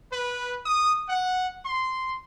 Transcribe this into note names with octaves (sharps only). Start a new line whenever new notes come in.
B4
D#6
F#5
C6